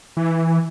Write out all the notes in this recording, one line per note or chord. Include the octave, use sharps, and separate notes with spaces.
E3